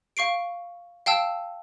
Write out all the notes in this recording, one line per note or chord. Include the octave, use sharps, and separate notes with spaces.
F5 C#6 C7 D7
F5 G5 A5 E6